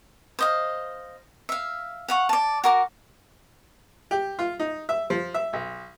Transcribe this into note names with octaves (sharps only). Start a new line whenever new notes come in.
C5 D#5 F5
E5 F5
F5 F#5 C#6
D5 A5
F#4 A#4 D6
G4
F4
D#4
E5
F3
E5
B1